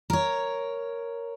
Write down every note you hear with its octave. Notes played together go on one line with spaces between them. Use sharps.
A#4 C#5